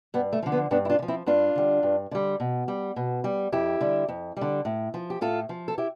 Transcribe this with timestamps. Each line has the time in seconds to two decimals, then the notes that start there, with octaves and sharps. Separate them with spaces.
0.14 G2 B3
0.33 A3
0.43 D3 F3
0.52 B3
0.71 G2 B3 D4
0.85 E4
0.90 D4 F4
0.99 D3
1.02 F3
1.08 C4 E4
1.26 G2 D4 F4
1.55 D3 G3
1.83 G2
2.11 D3 G3
2.40 B2
2.68 G3
2.96 B2
3.24 G3
3.52 F2 E4 G4
3.81 D3 G3
4.08 F2
4.37 D3 G3
4.65 A2
4.94 F3
5.10 G4
5.21 A2 F4 A4
5.49 F3
5.68 A4
5.78 E4 G4